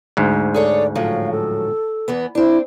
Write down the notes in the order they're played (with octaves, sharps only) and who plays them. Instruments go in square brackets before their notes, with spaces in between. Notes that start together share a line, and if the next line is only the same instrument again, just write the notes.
[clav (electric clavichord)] D2 G#2
[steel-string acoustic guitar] G#4 A4 C#5 [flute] D5
[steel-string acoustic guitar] A2 F3 F#3 [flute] F5
[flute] A4
[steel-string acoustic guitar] E2 E3 B3
[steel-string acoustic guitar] C4 D4 [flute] E4